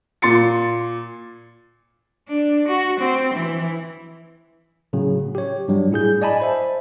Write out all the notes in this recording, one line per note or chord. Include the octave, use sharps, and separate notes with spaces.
A#2 C6 A6 C#7
D4
F#4
C4
E3
A2 C#3 F#3
G4 C#5
G2 F#3 G3
A2 E4 G#4 G6
D5 D#5 G#5 A5 B5
C5 E5